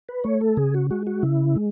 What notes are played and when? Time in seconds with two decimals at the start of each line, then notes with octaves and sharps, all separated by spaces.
0.09 B4
0.24 A3 C#5
0.41 A4
0.57 C#3 G#4
0.74 F#4
0.91 G#3 F#4
1.07 F#4
1.23 C#3 E4
1.56 G#3